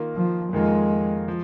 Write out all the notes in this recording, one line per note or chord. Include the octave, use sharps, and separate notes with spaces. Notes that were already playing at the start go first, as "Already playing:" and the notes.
Already playing: D#3 A#3 F4
F3
F2 D#3 G#3 A#3 F4
F3